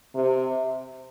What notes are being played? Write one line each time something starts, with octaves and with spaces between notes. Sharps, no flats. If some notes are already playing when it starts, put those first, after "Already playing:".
C3